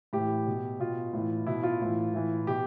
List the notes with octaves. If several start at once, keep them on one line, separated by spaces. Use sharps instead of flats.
A2 E3 G4
B2
B2 F4
A2 E3
B2 E4
F4
A2 E3
A2 E3
B2 G4